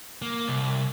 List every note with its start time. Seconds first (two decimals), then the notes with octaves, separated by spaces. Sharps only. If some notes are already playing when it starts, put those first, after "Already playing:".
0.22 A#3
0.48 C2